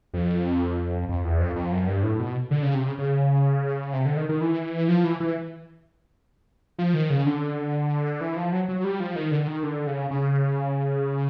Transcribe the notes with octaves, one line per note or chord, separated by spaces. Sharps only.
F2
F2
E2
F2
F2
F#2
G2
A2
B2
D3
C#3
C3
C#3
C#3
C3
D3
D#3
D#3
E3
F3
E3
E3
F3
D#3
C#3
D3
E3
F3
F#3
F#3
G3
F3
D#3
D3
D#3
D3
C#3
C#3